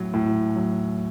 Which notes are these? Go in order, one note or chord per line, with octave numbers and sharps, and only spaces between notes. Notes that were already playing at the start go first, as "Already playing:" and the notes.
Already playing: A2 F#3
A2
F#3